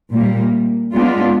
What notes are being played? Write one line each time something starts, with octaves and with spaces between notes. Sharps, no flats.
A#2 G3 A#3
G#3 B3 D4 F4